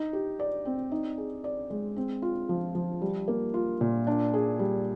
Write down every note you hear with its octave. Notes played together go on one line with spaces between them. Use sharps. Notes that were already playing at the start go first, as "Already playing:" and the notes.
Already playing: D#4
G4
D5
C4
D#4
G#4
D5
G#3
C4
F4
F3
F3
G3
A#3
F4
A#2
D4
G#4
G3